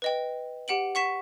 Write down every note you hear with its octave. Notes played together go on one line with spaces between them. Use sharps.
B4 D#5 G5
G4 F#5 D7 F#7
F#5 C#6 B6 E7